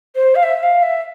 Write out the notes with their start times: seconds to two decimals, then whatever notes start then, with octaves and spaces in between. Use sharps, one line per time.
0.16 C5
0.35 F5
0.43 E5
0.63 F5
0.82 E5